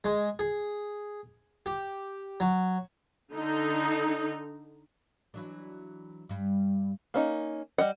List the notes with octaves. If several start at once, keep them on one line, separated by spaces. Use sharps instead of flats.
G#3
G#4
G4
F#3
D3 D#4
E3 F#3 D4
G2 G3
A#3 C#4 D#4
G3 D#5 F#5